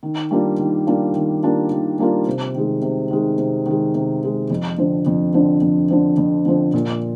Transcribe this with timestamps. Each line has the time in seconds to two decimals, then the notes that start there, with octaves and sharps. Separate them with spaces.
0.03 D#3
0.31 G3 A#3 D4 F4
0.59 D#3
0.87 G3 A#3 D4 F4
1.15 D#3
1.43 G3 A#3 D4 F4
1.71 D#3
1.99 G3 A#3 D4 F4
2.26 C3
2.55 D#3 G#3
2.82 C3
3.10 D#3 G#3
3.38 C3
3.66 D#3 G#3
3.94 C3
4.22 D#3 G#3
4.50 F2
4.78 D3 F3 C4
5.06 F2
5.34 D3 F3 C4
5.62 F2
5.90 D3 F3 C4
6.18 F2
6.45 D3 F3 C4
6.74 A#2